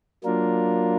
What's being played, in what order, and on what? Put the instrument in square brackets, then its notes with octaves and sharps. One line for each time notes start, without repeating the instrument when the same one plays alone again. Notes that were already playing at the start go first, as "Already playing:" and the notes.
[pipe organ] F#3 A#3 D4 F4 A#4